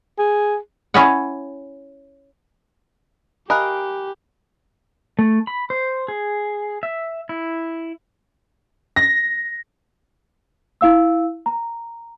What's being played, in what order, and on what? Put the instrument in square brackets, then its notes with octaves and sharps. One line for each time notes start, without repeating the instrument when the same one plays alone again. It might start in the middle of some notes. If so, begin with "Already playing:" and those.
[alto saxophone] G#4
[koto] C#4 E4 C#5 D#5 F#5
[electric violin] G4 [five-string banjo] A#4 D#5 F5 [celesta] G#5 B5 F#6
[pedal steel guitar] A3
B5
C5
G#4
E5
E4
[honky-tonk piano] A#6
[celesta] E4 F5 E6
A#5